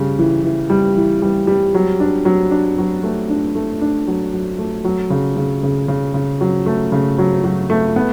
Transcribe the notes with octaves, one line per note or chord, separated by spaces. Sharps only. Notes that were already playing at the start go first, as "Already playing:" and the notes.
Already playing: C#3 G3
E3
E3
G3
E3
G3
G3
F#3
D4
F#3
D4
F#3
A3
D4
A3
D4
F#3
F#3
A3
F#3
C#3
C#3
C#3
C#3
C#3
F#3
A3
C#3
F#3
F#3
A3
B3